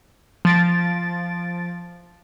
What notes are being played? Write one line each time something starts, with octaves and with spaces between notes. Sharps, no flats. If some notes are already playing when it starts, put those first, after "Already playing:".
F3 A6 D7